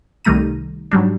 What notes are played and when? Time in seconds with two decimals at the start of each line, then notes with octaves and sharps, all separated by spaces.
0.25 C2 D#3 G3 A3 A#5 D#7
0.91 G#2 F#3 G3 D4